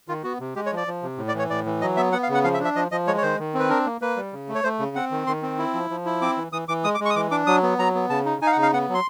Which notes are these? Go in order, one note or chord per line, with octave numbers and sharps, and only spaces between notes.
D#3 F4
B3 F#4
C3
G#3 G4
C#5
F3
D5
F3
C3
A2
D5
E3 C#5
A2 D5
E3
F#3 D#5
B3 E5
B3 F#5
F5
C#3
F#5
F3 F5
E5
D4
E5
F3 D#5
F3 D#5
G#3 C#5
C#5
D#3 C5
D#3
C4
B4
D4 A#4
A#3
A#3 B4
G3
C#3
A3
C#5
A3 C5
C#3
C4 F#5
D#3
D#3 C6
C4
E4
F3
F3
E4
C4 D6
E3
E3 D#6
E3 D6
G#3 D#6
D6
G#3
C#6
D#6
E3 D6
D4 D6
F#3 D#6
B3
F#3 A#5
B3
C#3 A5
D#4
D#4 G#5
F5
F#5
C#3
F5
B3 F#5
F#3
C6